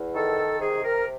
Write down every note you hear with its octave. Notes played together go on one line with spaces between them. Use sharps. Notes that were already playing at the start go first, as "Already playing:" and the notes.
Already playing: E2
D#3 A4
C3 G#4
A#4